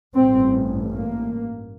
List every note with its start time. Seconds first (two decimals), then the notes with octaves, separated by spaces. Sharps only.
0.15 A1 G2 C4
0.94 A#3